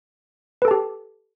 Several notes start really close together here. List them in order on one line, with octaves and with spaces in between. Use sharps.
B4 A4 A5 G4